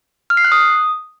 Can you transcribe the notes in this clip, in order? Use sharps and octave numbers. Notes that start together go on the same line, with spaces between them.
F6
C7
F#6
D#6